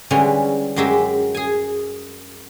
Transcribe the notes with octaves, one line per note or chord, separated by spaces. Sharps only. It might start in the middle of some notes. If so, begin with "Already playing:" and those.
D3 E3 G3 G#3 C#4
F#2 F#3 G#3 G4 E5
G#4 G#5